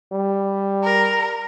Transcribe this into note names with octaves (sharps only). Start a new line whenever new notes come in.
G3
A#4